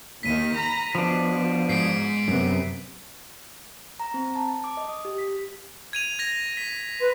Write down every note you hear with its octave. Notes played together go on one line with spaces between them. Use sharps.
D#2 D#3 B6 D#7
A#5 B5
B2 F3 D4
G#2 G#3 C7 D7
F#2 C3 B3 C4
A#5
C4
A5
A5
D6
D#5
D#6
G4
B6
G#6 D#7 F7
G#6 A#6 F7
B6
B4 C6